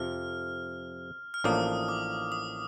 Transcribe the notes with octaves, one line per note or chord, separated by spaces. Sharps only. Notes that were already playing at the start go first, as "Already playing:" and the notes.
Already playing: F2 C3 F3 F6
F6
A1 A2 F3 A#3 D4 D#6
D6
D#6